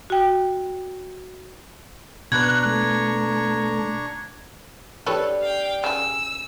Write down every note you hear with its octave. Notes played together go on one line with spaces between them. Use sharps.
F#4 G5
B2 D4 B4 A#5 C#6 F#6 G#6
A3
D4 G4 A4 B4 C#5 D5
F5 G5
C#3 G#5 E6